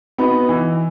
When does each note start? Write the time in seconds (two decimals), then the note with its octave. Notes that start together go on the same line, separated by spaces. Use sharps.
0.18 B3 D#4 F#4 B4
0.49 E3